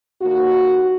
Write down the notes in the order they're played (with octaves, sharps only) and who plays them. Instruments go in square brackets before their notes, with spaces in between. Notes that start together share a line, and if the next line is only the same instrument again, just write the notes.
[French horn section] D#2 F#4